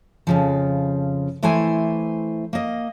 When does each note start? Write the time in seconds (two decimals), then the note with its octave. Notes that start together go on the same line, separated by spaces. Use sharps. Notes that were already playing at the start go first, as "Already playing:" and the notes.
0.27 F2 C#3 F3
1.43 E3 A3 E4 C5 G#5
2.53 A#3 D#5